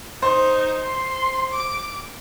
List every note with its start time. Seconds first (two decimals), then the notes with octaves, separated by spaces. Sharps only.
0.22 D#4 C5
0.85 C6
1.53 D6